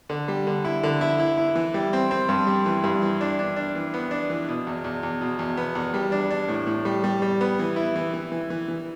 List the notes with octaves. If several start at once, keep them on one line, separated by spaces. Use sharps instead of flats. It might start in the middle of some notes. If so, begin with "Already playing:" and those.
D3
G3
D3
E4
D3
E4
E4
E4
E3
G3
C4
C4
G2
G3
E3
G2
E3
D4
D4
D4
E3
B3
D4
E3
B2
E2
E2
E2
B2
E2
B3
E2
G3
D4
D4
A2
A2
G3
G3
G3
B3
E3
E4
E3
E3
E3
E3
E3